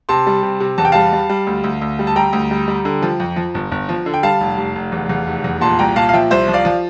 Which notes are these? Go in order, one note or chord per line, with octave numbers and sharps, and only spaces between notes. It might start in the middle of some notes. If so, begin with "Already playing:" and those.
C3 A5 C6
G3
C3
C3
E2 A5
G5
G3 F5 A5
G3
G3
D2
D2
D2
G3
A5
G3 G5 A#5
D2
G3
G3
D3
F3
F2
F3
G1
G1
F3
D3
G5
G3 F5 A5
F1
F1
F1
E2
E2
F1
E2
A#2 A5 C6
C2 G5 A#5
A#2 F5 A5
F5
F3 E5 G5
C2 C5 E5
F3
D5 F5
F3